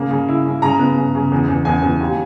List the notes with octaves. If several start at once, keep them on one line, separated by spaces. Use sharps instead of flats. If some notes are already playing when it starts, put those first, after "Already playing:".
Already playing: C#3 A#3
C#3
E4
C#3
C#3 A#5
B3
C#3
C#3
E2
E2
E2 G#5
E2
D#2